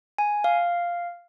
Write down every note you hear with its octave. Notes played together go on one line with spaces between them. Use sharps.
G#5
F5